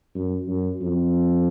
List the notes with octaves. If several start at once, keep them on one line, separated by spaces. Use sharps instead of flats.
F#2
F#2
F2